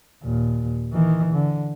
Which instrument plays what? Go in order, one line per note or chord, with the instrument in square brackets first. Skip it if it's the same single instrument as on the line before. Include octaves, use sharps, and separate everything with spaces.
[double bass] D#2 A#2
D#3 E3
D3